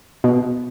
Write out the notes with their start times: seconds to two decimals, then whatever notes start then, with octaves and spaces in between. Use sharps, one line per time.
0.24 B2